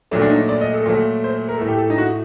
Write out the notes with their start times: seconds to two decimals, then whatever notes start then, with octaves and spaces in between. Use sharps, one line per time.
0.11 A#2 F#3 A3 D4
0.22 D4
0.30 D#4
0.49 D5
0.61 D#5
0.74 A4
0.86 A#2 F#3 A3
1.24 C5
1.49 A#4
1.58 A2 A3 A4
1.68 G4
1.78 A4
1.90 D#4
1.98 F#4